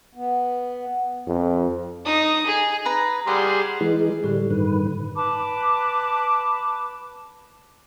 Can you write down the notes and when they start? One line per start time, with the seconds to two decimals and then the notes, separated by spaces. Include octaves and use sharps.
0.15 B3
1.27 F2
2.05 D#4 D#6
2.47 G#4
2.85 B4 A#5
3.27 G3 G#4 F#5 C6
3.81 E3 G#3
4.24 A2 D3 G3
4.50 G2 D#3 B4
5.16 B4 A5 B5 D6